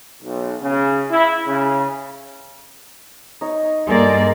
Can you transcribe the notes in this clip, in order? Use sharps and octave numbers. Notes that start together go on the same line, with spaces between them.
B1
C#3
E4
C#3
D#4 C#5
G2 G#3 A#3 A4 D5 C6